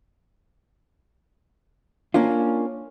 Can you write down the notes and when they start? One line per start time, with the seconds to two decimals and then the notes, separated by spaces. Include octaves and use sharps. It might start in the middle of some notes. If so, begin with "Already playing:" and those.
2.14 A#3 C#4 D4 F4